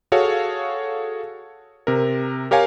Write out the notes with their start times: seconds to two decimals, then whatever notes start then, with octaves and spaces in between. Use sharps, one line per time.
0.12 F#4 G#4 A4 C#5 F5
1.87 C3 A#4
2.51 G4 A#4 C#5 F5 G#5